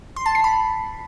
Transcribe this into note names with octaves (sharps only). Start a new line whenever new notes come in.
C6
A5
C7
B5